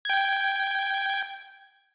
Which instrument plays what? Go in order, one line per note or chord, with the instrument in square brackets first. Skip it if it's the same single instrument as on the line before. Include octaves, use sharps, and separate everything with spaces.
[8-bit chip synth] G5 G#6